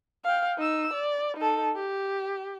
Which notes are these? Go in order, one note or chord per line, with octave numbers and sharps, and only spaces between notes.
F5 G5
D#4 E6
D5
D#4 A4
G4